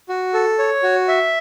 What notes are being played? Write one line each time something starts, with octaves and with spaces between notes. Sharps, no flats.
F#4
A4
C#5
F#4
E5